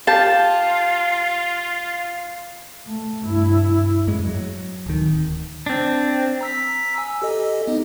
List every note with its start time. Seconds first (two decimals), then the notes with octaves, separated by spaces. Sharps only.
0.07 F4 G4 F5 A5
2.86 A3
3.23 G2 E4
4.07 F#2 A2 G#3
4.26 F#3
4.86 D1 D#3
5.66 C4 D4
6.41 A#5 E6 B6
6.98 G#5 E6
7.22 G4 A4 D#5
7.67 B3 D#4